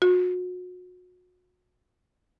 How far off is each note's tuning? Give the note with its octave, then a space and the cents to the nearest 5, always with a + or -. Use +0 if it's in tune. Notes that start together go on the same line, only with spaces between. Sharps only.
F#4 -35